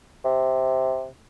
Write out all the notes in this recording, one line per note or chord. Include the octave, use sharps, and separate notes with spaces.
C3